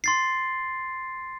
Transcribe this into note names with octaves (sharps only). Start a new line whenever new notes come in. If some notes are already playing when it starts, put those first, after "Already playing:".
C6 A6 C7